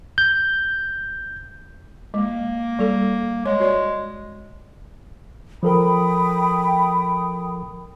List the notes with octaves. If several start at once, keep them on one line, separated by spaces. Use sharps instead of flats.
G6
G#3 A#3
G3 A4
G#3 C#5
F#4 C#5 D5
F3 A4 A#4 G5 B5 D#6